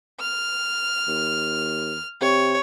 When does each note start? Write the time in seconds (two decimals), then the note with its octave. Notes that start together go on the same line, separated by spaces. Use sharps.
0.20 F6
1.08 D#2
2.21 C3 C#5